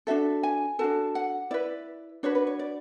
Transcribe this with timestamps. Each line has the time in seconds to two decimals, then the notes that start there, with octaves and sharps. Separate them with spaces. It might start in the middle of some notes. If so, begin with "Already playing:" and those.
0.07 D4 F#4 A4 E5
0.43 G#5
0.79 D4 F#4 A4 A5
1.15 F#5
1.51 E4 B4 D5
2.23 D4 F#4 B4 C#5
2.35 B4
2.47 C#5
2.59 D5